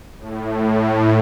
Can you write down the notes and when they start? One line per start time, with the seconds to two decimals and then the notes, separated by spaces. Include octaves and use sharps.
0.19 A2